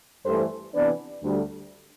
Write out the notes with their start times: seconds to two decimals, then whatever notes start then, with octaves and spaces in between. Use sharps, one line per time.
0.26 G2 E3 A3 A4 C5
0.74 C3 E3 B3 D4 B4 D5
1.22 D2 D3 G3